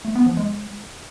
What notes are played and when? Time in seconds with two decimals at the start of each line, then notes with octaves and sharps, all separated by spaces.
0.05 A3
0.15 B3
0.26 F3
0.37 G#3